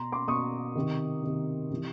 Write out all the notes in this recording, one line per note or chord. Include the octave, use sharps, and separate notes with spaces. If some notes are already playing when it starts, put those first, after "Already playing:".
Already playing: B2 A#5 C6
C6 D6
B2 C#6 D#6
C3 D#3
C3 D#3
C3 E3